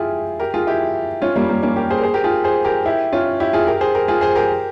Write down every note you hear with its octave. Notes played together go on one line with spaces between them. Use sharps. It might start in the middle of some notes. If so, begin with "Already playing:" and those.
Already playing: E4 F4 G4 G#4
G4 A#4
F4 G#4
E4 G4
C#4 F4
G3 A#3
G3 A#3
A#3 C#4
G4 A#4
G#4 C5
A#4
G#4 C5
G4 A#4
F4 G#4
G#4 C5
G4 A#4
E4 G4
C#4 F4
E4 G4
F4 G#4
G4 A#4
G#4 C5
G4 A#4
F4 G#4
G#4 C5
G4 A#4